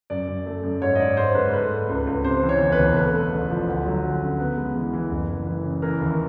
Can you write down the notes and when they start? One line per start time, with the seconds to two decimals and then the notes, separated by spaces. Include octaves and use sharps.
0.10 F#2 D5
0.28 F#2
0.46 A3
0.63 F#2
0.81 G#2 C#5
0.95 D#5
1.00 G#2 D5
1.17 G#2 C5
1.35 G#2 B4
1.53 A3 B4
1.71 A3
1.89 C#2
2.07 C#2
2.24 C3 C5
2.43 E3
2.49 C#5
2.61 E2
2.72 B4
2.78 E1
2.96 A3 B4
3.14 A3
3.32 A1
3.50 F3
3.68 D2
3.86 F#3
4.04 D2
4.21 C#3
4.40 B3
4.57 G#3
4.76 E3
4.93 E3
5.11 F#1
5.29 E3
5.47 E3
5.64 C#3
5.82 E3 A#4
6.01 D#2